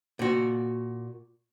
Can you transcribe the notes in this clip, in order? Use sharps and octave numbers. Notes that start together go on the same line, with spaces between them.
A#2 F#4